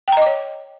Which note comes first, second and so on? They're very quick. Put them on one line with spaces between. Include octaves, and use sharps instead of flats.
G5 A#5 D#5 D6 C#5